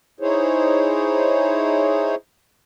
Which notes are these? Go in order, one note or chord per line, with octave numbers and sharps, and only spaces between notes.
D#4 E4 G#4 C5 C#5